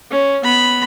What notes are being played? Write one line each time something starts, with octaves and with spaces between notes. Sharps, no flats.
C#4
B3 B5